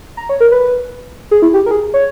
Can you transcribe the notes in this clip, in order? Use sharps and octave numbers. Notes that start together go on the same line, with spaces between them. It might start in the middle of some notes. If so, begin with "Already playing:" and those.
A#5
C#5
A#4
B4
G#4
E4
G4
A#4
G#4
C#5